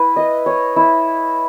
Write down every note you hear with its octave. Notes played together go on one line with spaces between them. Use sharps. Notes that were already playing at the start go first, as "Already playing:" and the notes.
Already playing: E4 B4
D#5
C#5
E4